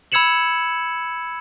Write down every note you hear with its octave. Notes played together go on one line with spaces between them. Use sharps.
B5 E6 G#6 C#7 E7 F#7